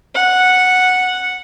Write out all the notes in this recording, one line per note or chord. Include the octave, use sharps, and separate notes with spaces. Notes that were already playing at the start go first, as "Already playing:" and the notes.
F#5